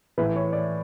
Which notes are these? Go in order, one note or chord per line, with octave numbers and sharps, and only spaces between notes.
A2 E3 B4
C#5
D5